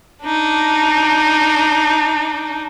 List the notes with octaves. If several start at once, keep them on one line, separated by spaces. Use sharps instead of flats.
D4 D#4